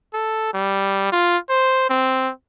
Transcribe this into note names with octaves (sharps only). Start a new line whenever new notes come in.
A4
G3
F4
C5
C4